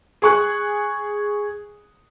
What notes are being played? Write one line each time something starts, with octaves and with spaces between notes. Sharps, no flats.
G#4 C#6 F#6